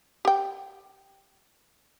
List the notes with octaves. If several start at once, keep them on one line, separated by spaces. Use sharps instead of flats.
G4 G5